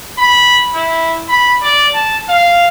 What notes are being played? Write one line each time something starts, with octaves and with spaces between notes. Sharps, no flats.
B5
E4
B5
D5
A5
F5